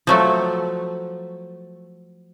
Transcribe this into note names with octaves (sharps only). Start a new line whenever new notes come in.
F3 F#3 A3